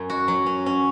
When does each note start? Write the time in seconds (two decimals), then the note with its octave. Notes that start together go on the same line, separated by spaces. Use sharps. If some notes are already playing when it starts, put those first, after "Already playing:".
Already playing: F#2
0.10 F#4
0.28 F#3
0.46 C#4
0.66 C#4